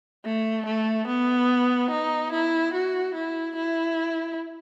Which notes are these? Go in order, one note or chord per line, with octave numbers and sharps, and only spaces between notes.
A3
A3
B3
D#4
E4
F#4
E4
E4